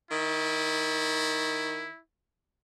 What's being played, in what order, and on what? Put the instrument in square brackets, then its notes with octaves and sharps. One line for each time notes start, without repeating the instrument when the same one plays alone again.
[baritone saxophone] D#3 [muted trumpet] E4